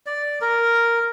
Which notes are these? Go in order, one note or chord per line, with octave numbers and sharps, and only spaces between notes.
D5
A#4